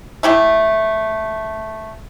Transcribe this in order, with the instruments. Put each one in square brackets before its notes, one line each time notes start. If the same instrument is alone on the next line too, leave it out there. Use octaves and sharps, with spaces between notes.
[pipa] A3 E4 G4